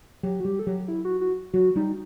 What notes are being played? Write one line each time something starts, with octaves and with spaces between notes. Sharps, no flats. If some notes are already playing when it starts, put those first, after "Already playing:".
F#3 G4
F#4
G3 G4
A4
F#3 G4
E4
F#4
F#4
F#3 F#4
G3 D#4